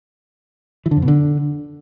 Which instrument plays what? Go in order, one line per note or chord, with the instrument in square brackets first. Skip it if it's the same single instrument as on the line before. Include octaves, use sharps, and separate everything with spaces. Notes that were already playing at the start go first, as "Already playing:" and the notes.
[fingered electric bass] E3
D3
F2
B2
D3